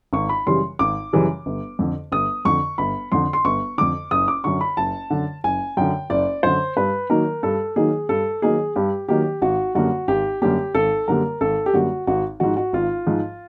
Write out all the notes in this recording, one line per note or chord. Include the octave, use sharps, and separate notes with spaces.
G#1 C#6
B5
F#2 C#3 E3 G3 C6
G#1 D6
F#2 C#3 E3 G3
G1
F2 D3
G1 D#6
F2 D3 C#6
G1 B5
F2 D3 C6
C6
G1 C#6
F2 D3 D6
F#1 D#6
D6
F#2 D3 C#6
B5
F#1 A5
F#2 D3
F#1 G#5
F#2 D3 G5
F#1 D5
F#2 D3 C5
G2 B4
D#3 F#3 A#3 D#4 A#4
G2 A4
D#3 F#3 A#3 D#4 G#4
G2 A4
D#3 F#3 A#3 D#4 G#4
G2 G4
D#3 F#3 A#3 D#4 G4
G#1 F#4
F#2 D3 G3 A#3 F#4
G#1 G4
F#2 D3 G3 A#3 G4
G#1 A4
F#2 D3 G3 A#3 A#4
G#1 A4
G4
F#2 D3 G3 A#3 F#4
G#1 F#4
G#2 F3 F#4
F#4
G#1 F4
G#2 F3